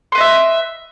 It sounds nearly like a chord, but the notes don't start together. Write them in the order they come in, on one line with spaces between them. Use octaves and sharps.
C6 B4 D#5 E5